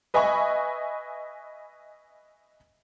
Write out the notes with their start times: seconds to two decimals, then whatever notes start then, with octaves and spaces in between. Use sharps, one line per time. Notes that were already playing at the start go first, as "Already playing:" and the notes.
0.14 B4 D#5 E5 G#5 B5 C#6